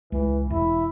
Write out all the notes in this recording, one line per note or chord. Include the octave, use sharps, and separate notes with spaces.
C#2 E3 G#3
E1 E4